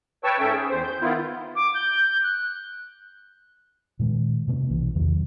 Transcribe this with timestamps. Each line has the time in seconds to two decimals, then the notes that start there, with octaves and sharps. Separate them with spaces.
0.24 B4 C#5 G5 A5 C#6 E6
0.40 G#2 C#4 A4 E5 G5
0.53 G#4
0.69 E2 C5
0.84 G6
1.01 D#3 B3 E4 F4
1.56 D6
1.74 G6
2.24 F#6
3.99 A#2 D#3 G#3
4.48 C3 A#3 B3 C#4
4.70 B1 E3
4.95 E2 C3 D#3 F#3